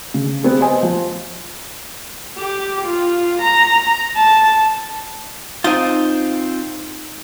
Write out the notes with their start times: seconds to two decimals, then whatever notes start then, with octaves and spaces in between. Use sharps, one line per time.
0.14 C#3
0.43 B3 C4 G4 G#4
0.61 C5 D#5 G#5
0.83 F3
2.37 G4
2.85 F4
3.42 A#5
4.16 A5
5.64 C4 D#4 F4 G#5